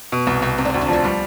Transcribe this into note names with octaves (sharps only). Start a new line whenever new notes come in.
B2
C2 B3
C2 C4
C3 C4
D4
C4
D2
D4
F3 C4
G3 B3